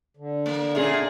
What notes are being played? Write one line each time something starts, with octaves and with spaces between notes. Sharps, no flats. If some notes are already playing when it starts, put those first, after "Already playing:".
D3
A#3
A#2 C#4 G#4 E5